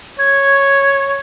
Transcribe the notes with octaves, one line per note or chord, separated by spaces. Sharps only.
C#5 G#6